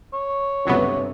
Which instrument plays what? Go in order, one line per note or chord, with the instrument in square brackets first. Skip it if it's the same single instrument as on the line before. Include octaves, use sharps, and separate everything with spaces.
[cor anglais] C#5
[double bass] G1 C3 [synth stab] C#2 F#3 B3